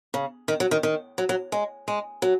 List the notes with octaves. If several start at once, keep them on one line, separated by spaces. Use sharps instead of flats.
C#3
D#3
F#3
D#3
D#3
F#3
F#3
G#3
G#3
F#3